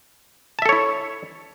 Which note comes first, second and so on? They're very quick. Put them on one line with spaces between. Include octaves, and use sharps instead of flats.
A5 E5 A4 C#5 E4